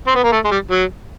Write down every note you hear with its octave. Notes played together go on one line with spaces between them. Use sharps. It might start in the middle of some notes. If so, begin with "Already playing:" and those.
C4
B3
A#3
A3
G#3
G3
F#3